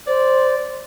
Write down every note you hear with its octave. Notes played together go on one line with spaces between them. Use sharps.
C5 D5